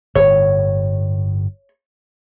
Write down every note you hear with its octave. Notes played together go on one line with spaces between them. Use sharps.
G1 A2 C#5